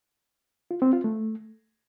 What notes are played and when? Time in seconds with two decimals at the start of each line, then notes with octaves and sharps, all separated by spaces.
0.71 F4
0.82 C4
0.93 F4
1.04 A3